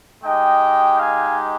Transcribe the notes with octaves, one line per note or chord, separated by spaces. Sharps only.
G#3 D#4 G4 D#5 G5
F5 G#5